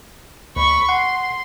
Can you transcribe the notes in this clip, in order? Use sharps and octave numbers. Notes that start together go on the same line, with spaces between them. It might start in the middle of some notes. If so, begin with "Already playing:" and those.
D2 B5 C#6
F#5 C6